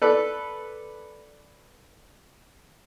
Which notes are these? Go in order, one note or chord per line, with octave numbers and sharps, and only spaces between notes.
A4 B4 D5